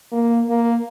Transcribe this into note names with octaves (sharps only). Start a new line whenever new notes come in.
A#3
A#3